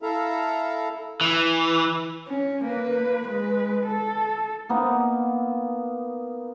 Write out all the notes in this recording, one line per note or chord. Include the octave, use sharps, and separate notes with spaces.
E4 A4 E5 F5 A#5
E3
C#4
A#3 B4
G#3 B4
A4
A#3 B3 D#4